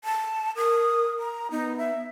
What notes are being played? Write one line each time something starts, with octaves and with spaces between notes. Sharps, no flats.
A5
A#4 D#6
A#5
B3 D#4
E5